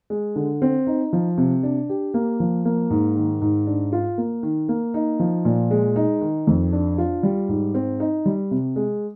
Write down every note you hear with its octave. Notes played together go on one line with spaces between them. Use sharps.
G#3
D3
C4
D#4
F3
C3
D4
G4
A#3
F3
A#3
G#2
D#3
G#2
D4
F4
A#3
D#3
A#3
D#4
F3
A#2
G#3
D#4
D#3
F2
D4
F4
G3
G#2
C4
D#4
G3
C3
G#3